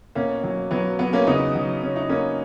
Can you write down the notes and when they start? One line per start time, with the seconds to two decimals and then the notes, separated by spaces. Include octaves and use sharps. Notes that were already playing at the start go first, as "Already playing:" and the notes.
0.15 B2 A#3 C#4
0.44 F#3
0.71 F#3 B3
0.99 F#3 B3
1.13 A#3 C#4
1.27 C#3 B3 D#4
1.55 F#3
1.82 C#3 C#4
1.96 D#4
2.09 C#3 A#3 C#4